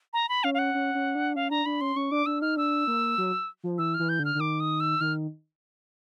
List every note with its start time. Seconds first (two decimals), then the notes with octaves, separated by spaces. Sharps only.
0.13 A#5
0.29 B5
0.44 C#4 F5
0.54 F5
0.59 F#5
0.74 C#4
0.95 C#4
1.15 D4
1.36 C#4 F5
1.51 D4 A#5
1.66 D4 B5
1.81 C#4 C6
1.96 C#4 C#6
2.12 D4 D6
2.26 D4 E6
2.41 D#4 F6
2.57 D4 E6
2.87 A#3
3.18 F#3
3.64 F3
3.78 E3 E6
3.94 F6
3.99 E3
4.09 G6
4.19 D3
4.25 F6
4.35 D3
4.40 D#3 D6
4.60 D#6
4.80 E6
5.00 D#3 F6